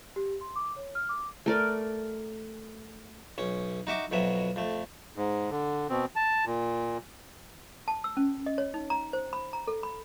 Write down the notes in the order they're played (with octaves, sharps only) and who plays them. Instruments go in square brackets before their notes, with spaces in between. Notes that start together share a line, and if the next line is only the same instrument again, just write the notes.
[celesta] G4
C6
D6
C#5
F6
D6
[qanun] A3 A#4 D5
[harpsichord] B1 C#4
D#4 F#4 E5 D6
F2 B2 F#3 E5
F2 A3
[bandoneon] G#2
D3
B2 C4
A5
A#2
[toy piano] A5
E6
C#4
D#5
C#5
D#4
A#5
C5
B5
A#5
A4
B5